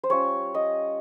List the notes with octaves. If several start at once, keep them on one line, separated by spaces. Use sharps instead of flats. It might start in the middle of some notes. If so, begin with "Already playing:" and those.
C5
G3 C#4 F4 C#5
D#5